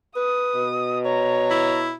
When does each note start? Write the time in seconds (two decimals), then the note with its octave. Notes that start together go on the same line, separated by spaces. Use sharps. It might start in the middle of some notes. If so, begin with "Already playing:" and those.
0.16 B4 D#6
0.56 B2
1.06 C#5 A#5
1.51 E4